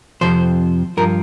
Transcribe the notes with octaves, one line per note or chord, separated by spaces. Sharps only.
F2 C3 F3 C5
G2 F3 A#4